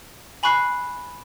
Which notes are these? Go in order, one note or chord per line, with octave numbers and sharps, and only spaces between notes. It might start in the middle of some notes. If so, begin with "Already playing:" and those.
G#5 B5 C#6 F#6 C7